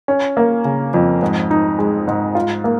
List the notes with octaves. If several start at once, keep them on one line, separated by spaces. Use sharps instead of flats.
C#4
A#3
C#3
F2
G#2
D#4
G#3
G#2
F4
A#3